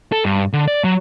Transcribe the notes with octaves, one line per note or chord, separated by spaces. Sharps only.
A4
G2
D3
D5
F#3